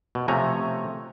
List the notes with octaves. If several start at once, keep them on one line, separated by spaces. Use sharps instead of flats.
B2
C3 F3 A3 C#5 G#5 A#5